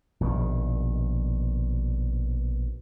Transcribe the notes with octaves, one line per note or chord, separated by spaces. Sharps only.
A#1 B2 D3 D#3